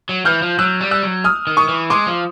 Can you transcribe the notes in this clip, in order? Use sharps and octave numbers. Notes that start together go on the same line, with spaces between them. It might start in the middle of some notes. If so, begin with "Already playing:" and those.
F#3
E3 F6 G6
F3
F#3 E6 F#6
G3
E6 F#6
F#3
D#6 F6
D#3
C#6 D#6
E3
G#3 C6 D6
F3